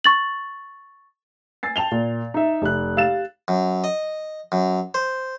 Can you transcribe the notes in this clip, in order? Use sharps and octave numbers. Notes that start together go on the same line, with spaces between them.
C#6 A6 F#7
G#5 E6 A6 C7
G5 A5 F7 G7
A#2
D#4 E5
F1 F#6
G4 F5 E6 A6 E7
F#2
D#5
F#2
C5